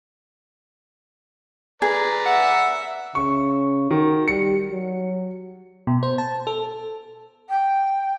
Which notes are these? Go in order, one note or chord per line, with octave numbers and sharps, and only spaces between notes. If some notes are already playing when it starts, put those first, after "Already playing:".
G#4 B4 D5 A#5
E5 F#5
C#3 C#6
D#3 F#4
G3 C#7
F#3
B2
C5
A5
A4
G5